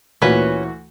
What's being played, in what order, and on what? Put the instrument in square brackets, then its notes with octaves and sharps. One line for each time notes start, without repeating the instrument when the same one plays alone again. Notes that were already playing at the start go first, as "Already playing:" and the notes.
[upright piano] D2 E3 [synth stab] A#2 [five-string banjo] C#4 B4 [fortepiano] F#4